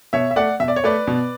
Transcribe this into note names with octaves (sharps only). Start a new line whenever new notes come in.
B2 C#5 E5
E5
A3 D5 F#5
B2 E5
D5
C#5
A3 B4 D5
B2